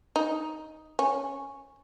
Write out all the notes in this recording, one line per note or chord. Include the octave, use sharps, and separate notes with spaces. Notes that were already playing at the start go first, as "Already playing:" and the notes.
D#4
C#4